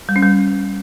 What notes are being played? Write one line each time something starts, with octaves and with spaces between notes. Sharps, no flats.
G3
C#4
G3